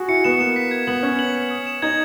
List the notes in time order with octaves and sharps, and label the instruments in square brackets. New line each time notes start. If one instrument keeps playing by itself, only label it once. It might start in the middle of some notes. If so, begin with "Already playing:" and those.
Already playing: [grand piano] F#4 G#4
[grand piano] E4 [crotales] C#7
[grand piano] B3 [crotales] E7
[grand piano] A#3 [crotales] E7
[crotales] B6
G#6
[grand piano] B3 [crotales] F#7
[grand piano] C#4 [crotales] G#6
[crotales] F#7
F#7
D#6
E7
[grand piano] D#4 [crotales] G#6